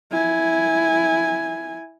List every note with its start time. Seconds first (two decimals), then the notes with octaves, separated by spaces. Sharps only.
0.12 E4 G#5